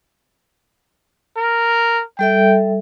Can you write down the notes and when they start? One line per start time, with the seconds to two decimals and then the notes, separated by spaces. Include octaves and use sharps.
1.37 A#4
2.19 G3 A4 E5 G5